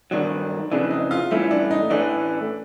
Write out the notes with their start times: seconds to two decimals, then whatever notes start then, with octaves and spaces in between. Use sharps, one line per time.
0.11 G2 D#3 F#3 D4
0.72 F2 C#3 E3 D4
0.91 D#4
1.11 F4
1.31 G2 E3 A3 C#4 E4
1.51 D4
1.71 D#4
1.90 A2 E3 A3 C#4 D4